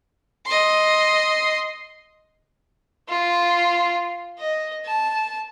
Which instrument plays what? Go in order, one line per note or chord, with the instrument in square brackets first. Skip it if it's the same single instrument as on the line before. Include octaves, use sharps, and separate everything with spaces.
[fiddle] D#5 C6
F4
D#5
A5